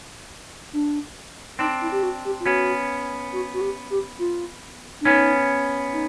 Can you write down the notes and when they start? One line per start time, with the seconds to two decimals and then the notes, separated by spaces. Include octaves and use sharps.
0.73 D4
1.59 C4 D4 D#4
1.81 E4
1.92 G4
2.03 F#4
2.25 G4
2.40 F4
2.46 B3 C#4 F#4
3.33 F#4
3.54 F#4
3.61 G4
3.90 G4
4.19 F4
5.01 D4
5.05 B3 C#4 D#4
5.93 D#4